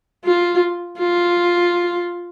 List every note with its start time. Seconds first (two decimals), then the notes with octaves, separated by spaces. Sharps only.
0.25 F4
0.99 F4